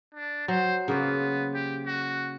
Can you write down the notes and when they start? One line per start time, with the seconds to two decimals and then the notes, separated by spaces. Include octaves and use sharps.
0.15 D4
0.48 F#3 C5
0.88 C#3 A#3 B3 C5
1.54 G4
1.86 F#4